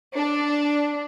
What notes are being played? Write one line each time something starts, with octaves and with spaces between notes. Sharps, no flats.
D4